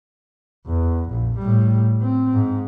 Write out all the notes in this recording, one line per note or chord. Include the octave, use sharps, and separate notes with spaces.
E2
A#1
A2 G3
C4
G#2